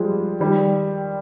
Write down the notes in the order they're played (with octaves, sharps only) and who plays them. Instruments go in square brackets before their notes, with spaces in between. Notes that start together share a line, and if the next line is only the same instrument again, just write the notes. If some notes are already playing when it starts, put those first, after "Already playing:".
Already playing: [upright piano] F3 G3 G#3
D#3 G3